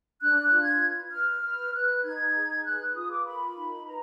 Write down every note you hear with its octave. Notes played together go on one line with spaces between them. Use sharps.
D4 F#6
F#6
F4
G#6
B4
B4 F6
B4 F6
B4 F#6
D#4 G#6
G#4
B4 F#6
F#6
F4 D#6
D6
A#4 B5
D#4
B4 A#5